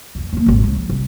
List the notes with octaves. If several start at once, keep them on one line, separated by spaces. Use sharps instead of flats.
B1 F2
D#2 A#3
D#1 G#1
C#2
F3
C2